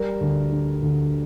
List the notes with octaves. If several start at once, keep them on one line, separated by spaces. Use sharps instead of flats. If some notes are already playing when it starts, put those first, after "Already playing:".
Already playing: G3 A#4
D2
D3
D2